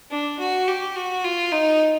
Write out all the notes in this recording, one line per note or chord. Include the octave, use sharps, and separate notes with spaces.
D4
F#4
G4
F#4
F4
D#4